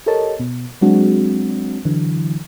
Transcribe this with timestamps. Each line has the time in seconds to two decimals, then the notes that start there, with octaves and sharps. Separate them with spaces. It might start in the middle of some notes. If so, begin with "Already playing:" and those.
0.06 G4 A4 A#4 C#5 D#5 A5
0.40 B2
0.81 F#3 G#3 C4 D4 F#4
1.85 D3 E3 F#3